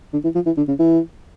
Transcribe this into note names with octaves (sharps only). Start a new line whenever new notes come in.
D3
E3
F3
E3
D3
C#3
E3